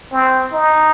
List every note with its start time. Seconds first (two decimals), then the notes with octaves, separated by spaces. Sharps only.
0.12 C4
0.53 D#4